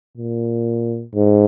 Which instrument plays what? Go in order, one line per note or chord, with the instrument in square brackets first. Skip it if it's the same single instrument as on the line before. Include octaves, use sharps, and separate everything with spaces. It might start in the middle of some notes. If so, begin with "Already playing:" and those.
[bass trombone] A#2
G#2